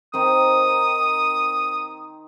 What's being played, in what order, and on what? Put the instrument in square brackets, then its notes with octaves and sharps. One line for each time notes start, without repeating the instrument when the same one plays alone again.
[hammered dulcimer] D#3 C4 D#4 [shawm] D#6